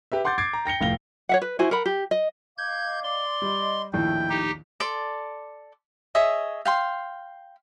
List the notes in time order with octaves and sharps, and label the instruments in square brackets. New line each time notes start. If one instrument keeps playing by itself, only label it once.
[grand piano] G4 B4 E5
F#5 C6 D6 G6 A6
D6 G#6 A6 C7 D7
A#5
G5 A#6 C#7 G7
F1 A2 F5 G5 A#6 G7
[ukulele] C#5 E5 F#5
B4
E4 F#4 C5 G#5
A#4 F#5 B5
G4
D#5
[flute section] D#5 F5 D6 [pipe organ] G6 G#6
[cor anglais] D5 [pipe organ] C6
[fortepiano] G3 [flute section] D#5
[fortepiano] A#1 D#2 A2 [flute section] E4 [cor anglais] G5
[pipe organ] D#4 G4
[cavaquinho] A4 D5 C6 D6
G#4 C#5 D#5 E5
F5 G5 C6